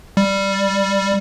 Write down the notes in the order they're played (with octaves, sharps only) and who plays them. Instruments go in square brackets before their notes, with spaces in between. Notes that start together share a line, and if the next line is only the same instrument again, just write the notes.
[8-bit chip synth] G3